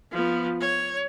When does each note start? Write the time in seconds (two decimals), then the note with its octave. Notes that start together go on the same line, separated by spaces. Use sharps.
0.12 F3 B3
0.60 C#5